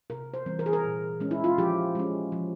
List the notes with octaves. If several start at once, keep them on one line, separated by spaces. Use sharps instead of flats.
C3 A#4
C5
E3 G3 C4
A#4
G#4
A#4
A#2
G#3 C#4
E4
F4
F3 G4
G#3 C#4
F3